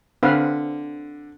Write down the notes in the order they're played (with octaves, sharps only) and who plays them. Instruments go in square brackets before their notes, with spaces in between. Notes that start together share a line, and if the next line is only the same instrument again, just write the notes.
[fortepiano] D3 [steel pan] C4 B4 F5